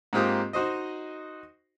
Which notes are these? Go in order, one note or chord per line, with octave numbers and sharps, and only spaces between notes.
G#2 A#3 C4 F4 G4 D#6
D#4 F#4 C5 D#5